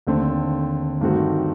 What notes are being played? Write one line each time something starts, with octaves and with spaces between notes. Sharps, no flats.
D#2 D3 A3 C4
G2 D#3 A3 C4 F#4